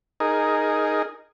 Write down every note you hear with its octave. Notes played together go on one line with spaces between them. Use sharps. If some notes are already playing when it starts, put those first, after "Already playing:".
D#4 G#4 A#4